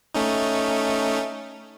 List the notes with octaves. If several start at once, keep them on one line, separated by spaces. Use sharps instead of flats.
A3 C#4 D#4